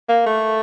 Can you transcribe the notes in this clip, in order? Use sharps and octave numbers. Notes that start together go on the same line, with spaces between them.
A#3
A3